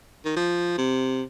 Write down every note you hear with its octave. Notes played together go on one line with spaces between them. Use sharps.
D#3
F3
C3